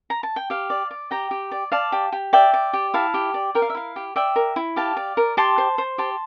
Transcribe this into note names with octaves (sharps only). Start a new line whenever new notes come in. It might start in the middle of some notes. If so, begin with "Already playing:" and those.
A#5
A5
G5
G4 F5
D5
D5
G4 G5 A#5
G4
D5
D5 F5 A5
G4
G4
D5 E5 G5
D5
G4
E4 F5 A5
G4
D5
A#4 G5
F5
E5
E4 F5
G4
D5 E5 G5
A#4
E4
G4 F5 A5
D5
A#4
G4 A5 C6
C5
C5
G4 A5 C6